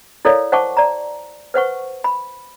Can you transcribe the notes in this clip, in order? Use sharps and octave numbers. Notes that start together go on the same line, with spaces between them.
E4 A4 A#4 C#5 D5 F5
C5 F#5 A5 C#6 D6
D5 A#5
B4 C5 F#5 C#6
B5